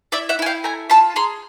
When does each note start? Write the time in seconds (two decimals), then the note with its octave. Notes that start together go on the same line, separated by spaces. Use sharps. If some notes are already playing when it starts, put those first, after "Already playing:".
0.12 E4 D5 E5
0.29 E5 F#5
0.39 E4 G#5
0.46 F5 G5
0.64 A3 G#5 A#5
0.90 F4 A5 B5
1.16 G#4 A#5 C6